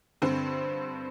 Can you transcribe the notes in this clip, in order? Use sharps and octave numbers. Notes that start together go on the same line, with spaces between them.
G2 D3 C4